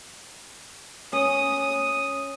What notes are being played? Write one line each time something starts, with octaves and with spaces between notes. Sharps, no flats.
C#4 D#6